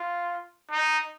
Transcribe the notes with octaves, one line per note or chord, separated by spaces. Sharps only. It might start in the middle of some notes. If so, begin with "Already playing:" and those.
Already playing: F4
D#4